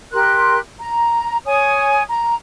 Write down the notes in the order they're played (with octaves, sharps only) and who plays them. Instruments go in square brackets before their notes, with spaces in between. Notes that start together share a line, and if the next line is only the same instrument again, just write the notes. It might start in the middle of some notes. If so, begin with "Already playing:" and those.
[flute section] G4 A#4 C6 F#6
A#5
C#5 G#5 D#6
A#5